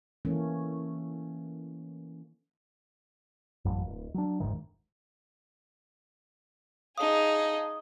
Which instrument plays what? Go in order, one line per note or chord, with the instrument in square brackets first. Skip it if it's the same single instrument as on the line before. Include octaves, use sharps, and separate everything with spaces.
[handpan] E3 A3 A#3 C#4
[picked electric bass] A1 F#2
D1
F#3 D4
F1 D2 G#2 D#3
[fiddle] D#4 G#4 [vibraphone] F5 A5 [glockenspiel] D#6 G7